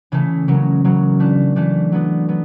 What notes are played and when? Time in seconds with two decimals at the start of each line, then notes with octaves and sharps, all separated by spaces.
0.12 C#3 E3 A3
0.48 C#3 F#3 A#3 C#4
0.84 C#3 F#3 A#3 C#4
1.20 E3 A3 D4
1.56 E3 A3 D4
1.92 F#3 B3 D4
2.29 F#3 B3